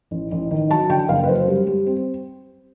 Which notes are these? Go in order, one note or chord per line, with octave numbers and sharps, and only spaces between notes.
A1
A1
D#3
F#3 A5
D3 G5
F#1 F5
B4
F#2 C5
G3
G3
C4